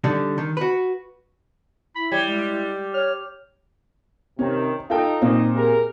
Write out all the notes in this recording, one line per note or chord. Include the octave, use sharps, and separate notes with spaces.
D3 G3 D#4
D#3
F#4 B4
E4 B5
G3 C#5
G#3
C#5 F6
C3 D#3 C#4
D#4 F4 A4 G5
A#2 C4 D#4 D#5
G4 G#4 A#4